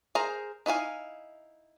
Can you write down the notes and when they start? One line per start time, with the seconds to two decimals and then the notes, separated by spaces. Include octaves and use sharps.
0.15 G#4 A#4 C5 A#5
0.66 D#4 E4 F5 G#5